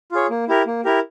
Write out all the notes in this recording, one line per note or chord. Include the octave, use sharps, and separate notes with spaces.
F4 G#4 C#5
A#3
E4 G4 A#4
A#3
E4 G4 A#4